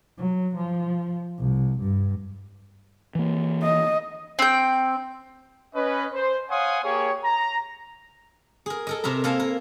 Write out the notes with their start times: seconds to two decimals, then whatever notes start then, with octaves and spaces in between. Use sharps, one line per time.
0.17 F#3
0.56 F3
1.38 C2
1.79 G2
3.15 E3 A#3
3.63 D#5
4.39 C4 G5
5.75 C#4 B4 D#5
6.14 C5
6.51 C#5 F5 F#5 G#5 C6 D#6
6.84 A#3 G4 G#4 C#5
7.24 A#5
8.66 G#4 A#4
8.87 A4 A#4 D#5
9.04 C3 A#4 E5 A#5
9.24 A#3 A4 A#4 F5 G#5 A5
9.40 A#4